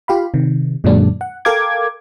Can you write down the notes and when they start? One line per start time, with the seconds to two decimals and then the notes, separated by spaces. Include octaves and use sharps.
0.08 F4 G4 F5 B5
0.34 C3 D#3
0.84 F#2 A#2 D3 F#3 G#3 D4
1.21 F#5
1.45 A4 A#4 F5 G5 D6 G#6